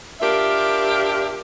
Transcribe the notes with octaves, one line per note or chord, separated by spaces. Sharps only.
D4 F4 G4 A#4 E5